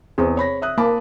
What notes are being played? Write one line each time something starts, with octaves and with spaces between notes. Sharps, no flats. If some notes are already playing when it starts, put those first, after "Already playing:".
E2 C4 G#4
C#5 B5 A#6
E5 D#6 F#6
A#3 A5 B5 D6